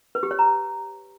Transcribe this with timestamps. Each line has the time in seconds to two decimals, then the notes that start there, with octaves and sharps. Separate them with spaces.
0.15 B4
0.23 G4
0.31 C#5
0.39 A#5